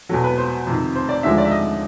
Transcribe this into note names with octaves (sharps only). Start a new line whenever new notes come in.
E2 B2 F#3 A4
B4
C5
F2 C3 D#3
C5
D5
D#2 D3 F3 G#3 E5
D5
E5
D#5